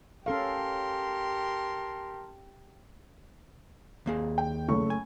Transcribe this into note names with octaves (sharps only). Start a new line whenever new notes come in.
C#4 G4 A4 A#4 F5 A5 C6
D#2 A#3 G#4
G5
F#1 A3 C#6
G#5